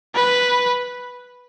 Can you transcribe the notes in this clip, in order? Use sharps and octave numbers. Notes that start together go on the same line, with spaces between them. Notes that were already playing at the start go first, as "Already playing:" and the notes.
B4